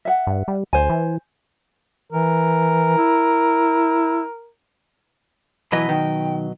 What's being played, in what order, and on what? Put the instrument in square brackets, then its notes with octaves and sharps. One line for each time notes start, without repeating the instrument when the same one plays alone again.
[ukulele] E5 F#5
[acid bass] G2
G3
[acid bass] D2 [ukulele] C5 G#5
[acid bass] E3
[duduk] E3 [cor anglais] A#4
[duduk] E4
[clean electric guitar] B2 F#3 D#5 [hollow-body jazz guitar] E3 B4
[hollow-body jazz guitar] D#3 [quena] G5